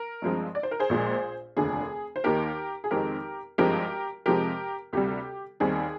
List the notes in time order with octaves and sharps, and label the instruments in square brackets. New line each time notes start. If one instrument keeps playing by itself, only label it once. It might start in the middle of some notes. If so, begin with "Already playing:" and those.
Already playing: [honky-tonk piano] A#4
G2 F3 G#3 C4
D5
C5
A#4
G#4 C5
A#1 A#2 G#3
F1 D#2 D3 G#4
C5
D#2 D#3 A#3 G4 A#4
G#4
F2 D#3 G#3 C4 G4 A#4
G#1 G2 F3 G#3 C4 G4 A#4
F2 C3 F3 G#3 C4 G4 A#4
D2 C3 G3 G4
D#2 D#3 G3 C4 G#4